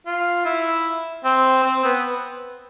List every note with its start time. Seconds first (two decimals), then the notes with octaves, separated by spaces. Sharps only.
0.06 F4
0.45 E4
1.25 C4
1.64 C4
1.84 B3